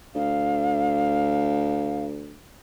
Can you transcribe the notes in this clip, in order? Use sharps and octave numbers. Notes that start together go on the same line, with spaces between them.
D2 F5